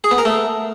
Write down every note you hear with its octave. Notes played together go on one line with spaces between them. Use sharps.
G#4
B3
A#4
A3